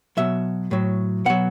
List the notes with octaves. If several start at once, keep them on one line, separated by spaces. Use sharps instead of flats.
B2 F#3 E5
A2 F#3
B2 F#3 F#5